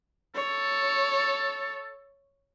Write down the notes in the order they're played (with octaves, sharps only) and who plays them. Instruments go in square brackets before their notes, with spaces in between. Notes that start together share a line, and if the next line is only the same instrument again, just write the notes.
[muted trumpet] A4 [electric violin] C#5